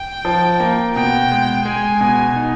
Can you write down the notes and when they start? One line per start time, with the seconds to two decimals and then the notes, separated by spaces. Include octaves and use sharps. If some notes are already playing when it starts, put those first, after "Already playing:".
Already playing: G5
0.25 F3
0.60 A#3
0.95 B2 G5
1.31 G#3
1.65 G#3 G#5
2.01 B2
2.36 D#4